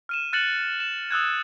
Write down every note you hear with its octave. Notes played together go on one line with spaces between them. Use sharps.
F6 D#7 E7
F6 F#6 A6 C#7 E7 F#7
E7
D#6 E6 F#6 G#6